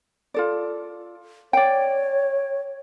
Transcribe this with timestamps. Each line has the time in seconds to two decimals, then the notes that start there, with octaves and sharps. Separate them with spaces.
0.34 F4 A4 D5
1.53 C#5 D5 G5